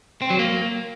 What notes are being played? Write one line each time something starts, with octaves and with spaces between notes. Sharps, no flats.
C4
F#3
A#3